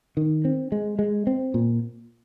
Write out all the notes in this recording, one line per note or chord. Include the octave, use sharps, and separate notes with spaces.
D#3
C4
G#3
G#3
C4
A#2